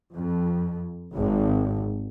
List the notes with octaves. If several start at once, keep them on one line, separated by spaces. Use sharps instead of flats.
F2
G#1